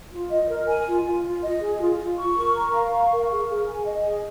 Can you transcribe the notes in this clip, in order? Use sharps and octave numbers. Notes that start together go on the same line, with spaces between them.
F4
D#5
A#4
G#5
F4
F4
F4
D#5
G#4
F4
F4
C#6
A#4
A#5
F5
C#6
A#4
G#4
G#4
G#5
D#5
G#4